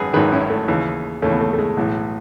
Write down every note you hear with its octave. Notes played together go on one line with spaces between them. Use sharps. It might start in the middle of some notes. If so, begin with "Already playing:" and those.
Already playing: G#1 F#2 G#4 B4
G#1 F#2 D#3 G#4 B4
C#4 E4
A3
D#2 C#3 E3
D#2 C#3 E3 A3 C#4
B3
A3
A3
G#3
B1 A2 E3